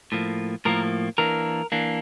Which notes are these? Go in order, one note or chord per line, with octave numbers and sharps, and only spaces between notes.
A2 F3 A#3
A2 F3 A#3 A#4
E3 A#3 D4 A#4
E3 A#3 D4